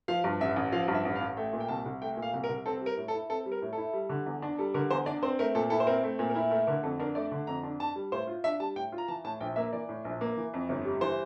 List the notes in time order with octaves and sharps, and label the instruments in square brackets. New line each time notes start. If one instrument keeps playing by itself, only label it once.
[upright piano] F3 [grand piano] F5
[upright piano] G2
[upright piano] A1 [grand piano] E5
[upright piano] A1
[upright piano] F3 [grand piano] F5
[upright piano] G2
[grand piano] E5
[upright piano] A1
[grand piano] F5
[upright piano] A1
[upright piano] A3 [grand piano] G5
[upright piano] A#2
[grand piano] G5
[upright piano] C2 [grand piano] A5
[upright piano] C2
[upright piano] A3 [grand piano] G5
[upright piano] A#2
[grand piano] F5
[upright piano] C2
[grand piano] A#4
[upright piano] C2
[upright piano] C4 [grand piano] A4
[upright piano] G3
[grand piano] A#4
[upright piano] A2
[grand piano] A4
[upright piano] E4
[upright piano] C4 [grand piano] A4
[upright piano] G3
[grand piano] A#4
[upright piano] A2
[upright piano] E4 [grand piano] A4
[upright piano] G3
D3
E2
D4
[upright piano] G3 [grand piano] A4
[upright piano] D3 [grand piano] A#4
[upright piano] E2 [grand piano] C5
[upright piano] D4 [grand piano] D5
[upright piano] C4 [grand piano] C5
[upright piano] A3 [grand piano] A#4
[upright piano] A#2 [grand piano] A4
[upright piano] E4 [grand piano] A4
[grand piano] C5
[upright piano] C4 [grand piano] A#4
[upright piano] A3
A#2
[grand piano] A#4
[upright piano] E4
[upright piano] A3 [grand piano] A#4
[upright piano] D3 [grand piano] A#4
[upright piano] F2 [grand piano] A4
[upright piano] D4 [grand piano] A#4
[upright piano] A3 [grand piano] D5
[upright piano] D3
[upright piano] F2 [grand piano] A#5
[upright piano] D4
[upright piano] D4 [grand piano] A5
[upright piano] G3
[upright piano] A2 [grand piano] C5
[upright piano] F4
[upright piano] D4 [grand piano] E5
[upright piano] G3 [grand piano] A5
[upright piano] A2 [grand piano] G5
[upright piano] F4
[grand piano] A#5
[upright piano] E3 [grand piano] A5
[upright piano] A2 [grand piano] A5
[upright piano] A#1 [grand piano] G5
[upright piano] A#3 [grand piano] E5
[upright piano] E3 [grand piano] D5
[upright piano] A2
A#1
A#3
E3
F2
G1
G3
[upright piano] E3 [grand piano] C5